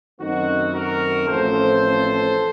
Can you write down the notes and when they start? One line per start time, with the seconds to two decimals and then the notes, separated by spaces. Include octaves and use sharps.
0.20 F#2 D#3 A3 C4 D#4 F#4
0.74 F#4 A#4
1.27 A1 A2 F3 C4 A4 C5